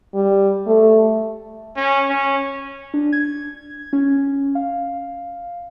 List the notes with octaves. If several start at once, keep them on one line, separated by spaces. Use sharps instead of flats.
G3
A3
C#4
C#4
D4
G#6
C#4
F5